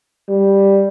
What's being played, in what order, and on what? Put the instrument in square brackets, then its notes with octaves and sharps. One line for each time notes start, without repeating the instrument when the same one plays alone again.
[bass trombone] G3